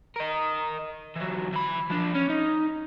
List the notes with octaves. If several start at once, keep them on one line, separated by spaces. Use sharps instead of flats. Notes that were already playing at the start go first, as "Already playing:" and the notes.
A#4 D#5
E3 F#3
E3 B5
F3 D4
C#4
D#4